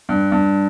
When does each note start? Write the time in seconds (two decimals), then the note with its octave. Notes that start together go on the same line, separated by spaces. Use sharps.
0.09 G2
0.32 G2